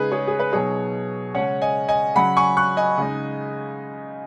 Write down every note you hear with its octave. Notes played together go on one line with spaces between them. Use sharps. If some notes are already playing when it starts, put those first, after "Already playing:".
Already playing: C#3 G#3 D#4 G#4 B4
G#4 C#5
G#4
B4
B2 F#3 B3 D#4 G#4 C#5
C#3 G#3 C#4 C#5 F#5
D#5 G#5
D#5 G#5
C#3 F#3 C#4 F#5 B5
G#5 C#6
C#6 F#6
D#5 G#5
C#3 G#3 D#4